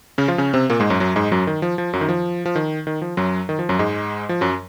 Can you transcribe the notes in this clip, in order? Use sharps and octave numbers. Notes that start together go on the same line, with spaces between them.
C#3 C#4
F3 F4
C#3 C#4
C3 C4
A#2 A#3
G#2 G#3
F#2 F#3
F#2 F#3
G#2 G#3
F#2 F#3
D#3
F3
F3
F#2 F#3
D#3
F3
F3
D#3
D#3
F3
F#2 F#3
D#3
F3
F#2 F#3
G#2 G#3
F3
F#2 F#3